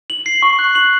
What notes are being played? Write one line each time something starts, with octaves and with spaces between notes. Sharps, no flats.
F#7
C7
C#6
F#6
F#7